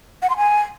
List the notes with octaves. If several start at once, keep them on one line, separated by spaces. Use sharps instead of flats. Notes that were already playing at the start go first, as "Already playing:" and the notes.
F#5
C6
G#5